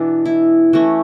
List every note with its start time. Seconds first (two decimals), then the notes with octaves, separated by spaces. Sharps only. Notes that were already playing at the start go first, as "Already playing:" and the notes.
Already playing: B2 E3 B3 D4
0.26 E4
0.73 E3 A3 C#4 F#4